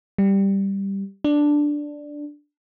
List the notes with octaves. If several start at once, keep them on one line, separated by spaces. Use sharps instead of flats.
G3
D4